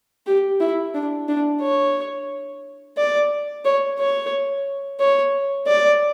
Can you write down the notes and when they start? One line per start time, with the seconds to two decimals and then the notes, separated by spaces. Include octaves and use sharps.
0.27 G4
0.61 E4
0.94 D4
1.29 D4
1.62 C#5
2.97 D5
3.65 C#5
3.99 C#5
5.00 C#5
5.68 D5